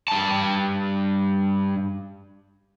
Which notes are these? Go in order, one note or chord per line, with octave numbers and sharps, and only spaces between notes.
G2 A5